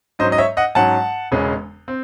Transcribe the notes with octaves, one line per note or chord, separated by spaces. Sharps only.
G#2 F#3 C#4 C5 D#5
D#5
C#5 E5
D#5 F#5
G#2 F#3 C#4 F#5 A5
E1 E2 C#3 G#3 C#4
C4